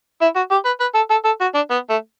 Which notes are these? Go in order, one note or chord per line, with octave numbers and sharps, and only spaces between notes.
E4
F#4
G4
B4
B4
A4
A4
A4
F#4
D4
B3
A3